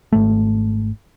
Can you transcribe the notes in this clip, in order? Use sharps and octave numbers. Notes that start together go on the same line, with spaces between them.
G#1 A3